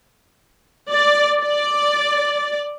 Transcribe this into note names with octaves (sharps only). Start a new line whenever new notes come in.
D5
D5